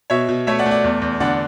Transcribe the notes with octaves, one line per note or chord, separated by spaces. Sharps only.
B2 C#5 E5
B2
A3 C#5 E5
D5 F#5
A3
D5 F#5
E2
E2
D3 D5 F#5